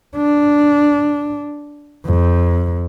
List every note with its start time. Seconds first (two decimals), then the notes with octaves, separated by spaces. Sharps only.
0.16 D4
2.06 F2